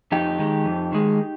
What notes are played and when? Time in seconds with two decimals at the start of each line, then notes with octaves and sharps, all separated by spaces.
0.12 F2 D#4 G4
0.39 D#3 G#3
0.66 F2
0.92 D#3 G#3